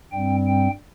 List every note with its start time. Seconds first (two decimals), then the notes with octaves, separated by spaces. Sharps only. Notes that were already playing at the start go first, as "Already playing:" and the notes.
0.12 G2 G3 C4 G5
0.47 G5